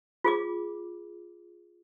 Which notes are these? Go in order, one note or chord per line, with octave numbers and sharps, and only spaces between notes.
F4 G#4 D6